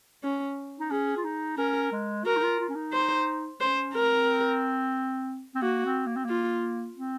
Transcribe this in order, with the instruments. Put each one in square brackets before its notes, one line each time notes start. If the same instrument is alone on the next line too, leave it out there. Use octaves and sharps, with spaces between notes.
[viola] C#4
[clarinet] D#4
[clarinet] C#4 [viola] G#4
[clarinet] F4
D#4
[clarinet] C#4 [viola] A#4
[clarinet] G#3
[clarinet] F#4 [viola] A#4
[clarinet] D#4
F4
F4
C#4
D#4
[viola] C5
[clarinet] C#4 [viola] C5
[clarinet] C4 [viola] A#4
[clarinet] C4
[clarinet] A#3 [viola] F#4
[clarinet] C4
A#3
C4
[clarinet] A#3 [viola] F4
[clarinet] C4